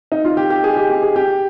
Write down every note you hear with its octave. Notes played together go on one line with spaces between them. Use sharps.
D#4
F4
G4
G4
G#4
G4
G4
G#4
G4